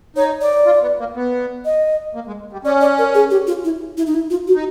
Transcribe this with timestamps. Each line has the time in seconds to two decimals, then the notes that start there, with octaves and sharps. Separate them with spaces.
0.16 D#4 C#5
0.41 D5
0.66 F4
0.82 B3
0.99 A#3
1.16 B3
1.65 D#5
2.15 A#3
2.27 G#3
2.53 G3
2.65 C#4 D5
2.81 D5
2.98 A#4
3.14 G#4
3.31 G4
3.47 F4
3.64 E4
3.97 E4
4.06 D#4
4.14 E4
4.30 F4
4.47 F#4
4.55 D#4